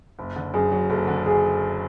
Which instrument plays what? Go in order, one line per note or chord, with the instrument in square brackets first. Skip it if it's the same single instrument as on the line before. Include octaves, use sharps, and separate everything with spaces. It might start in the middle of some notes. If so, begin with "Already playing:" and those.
[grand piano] F#1
D3
[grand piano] F#2 [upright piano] G#4
[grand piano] F#3
[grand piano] F#1 [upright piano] A4
[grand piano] D3
[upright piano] G#4